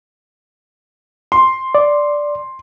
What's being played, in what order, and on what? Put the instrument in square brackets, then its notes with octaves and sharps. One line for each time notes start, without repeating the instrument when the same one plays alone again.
[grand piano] C6
[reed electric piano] D5